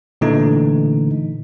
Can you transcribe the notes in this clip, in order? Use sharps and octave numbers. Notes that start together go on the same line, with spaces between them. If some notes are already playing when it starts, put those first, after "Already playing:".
A#2 D3 E3 A3 D#4